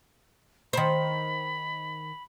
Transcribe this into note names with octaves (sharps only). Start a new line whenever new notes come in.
D#3 C5 B5